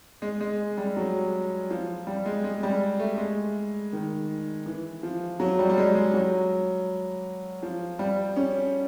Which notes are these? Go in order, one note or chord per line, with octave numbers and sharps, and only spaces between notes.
G#3
G#3
G3
F#3
F3
G3
G#3
G#3
G3
A3
G#3
D#3
E3
F3
F#3
G3
G3
G#3
G#3
F#3
F3
G3
C#4